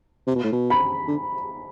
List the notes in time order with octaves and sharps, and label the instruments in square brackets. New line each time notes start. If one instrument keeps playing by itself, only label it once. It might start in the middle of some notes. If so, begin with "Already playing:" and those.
[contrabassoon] C3
B2
A2
B2
[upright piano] B5
[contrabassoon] D3